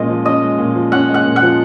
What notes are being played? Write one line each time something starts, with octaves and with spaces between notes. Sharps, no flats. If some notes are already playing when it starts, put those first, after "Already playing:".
Already playing: A#2 G#3 C#4 D#5
F3
C#4 D#5
G#3
A#2
F3
C#4 F#5
G#3
F#5
A#2
F#5
F3